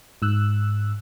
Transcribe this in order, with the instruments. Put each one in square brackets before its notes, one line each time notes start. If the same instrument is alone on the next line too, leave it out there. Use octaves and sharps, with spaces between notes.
[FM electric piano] G#2 E6 F#6